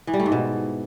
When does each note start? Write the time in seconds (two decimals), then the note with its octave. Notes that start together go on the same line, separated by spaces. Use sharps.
0.07 E3
0.13 G3
0.20 A3
0.26 G#2
0.32 B2